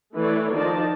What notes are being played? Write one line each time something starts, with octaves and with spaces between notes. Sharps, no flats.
E3 A3 A4 B4 C#5 D5
D#3 F3 D#4 F4 D5 A5